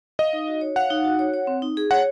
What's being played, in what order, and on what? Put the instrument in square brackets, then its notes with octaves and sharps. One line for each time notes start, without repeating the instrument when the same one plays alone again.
[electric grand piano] D#5 [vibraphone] F5
[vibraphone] D#4
F#4
C#5
[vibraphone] F5 [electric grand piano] F#5
[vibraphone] D#4
F#4
C#5
C#5
C4
D#4
G#4
[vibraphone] C#5 [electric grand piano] F#5